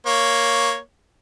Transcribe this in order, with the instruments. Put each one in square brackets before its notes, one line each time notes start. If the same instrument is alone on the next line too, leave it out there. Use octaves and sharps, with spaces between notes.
[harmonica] A#3 C#5